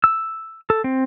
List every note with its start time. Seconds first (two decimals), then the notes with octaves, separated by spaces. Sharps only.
0.04 E6
0.70 A4
0.84 C4